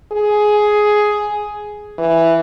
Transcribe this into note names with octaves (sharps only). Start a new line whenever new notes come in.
G#4
E3